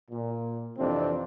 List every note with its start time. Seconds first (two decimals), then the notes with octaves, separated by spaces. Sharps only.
0.11 A#2
0.78 F2 C3 E3 C4 D4